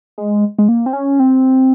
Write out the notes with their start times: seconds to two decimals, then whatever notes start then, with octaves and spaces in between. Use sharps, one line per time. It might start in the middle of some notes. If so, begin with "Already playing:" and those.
0.18 G#3
0.59 G#3
0.68 A#3
0.86 C4
0.93 C#4
1.19 C4